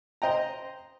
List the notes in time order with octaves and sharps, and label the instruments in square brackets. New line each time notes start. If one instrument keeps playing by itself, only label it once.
[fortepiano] C5 D#5 G5 A#5